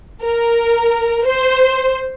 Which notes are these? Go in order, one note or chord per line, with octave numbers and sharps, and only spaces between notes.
A#4
C5